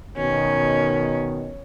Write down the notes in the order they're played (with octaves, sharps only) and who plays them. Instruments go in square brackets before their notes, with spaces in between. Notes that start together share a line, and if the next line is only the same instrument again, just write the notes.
[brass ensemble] B2 D#3 [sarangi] C#4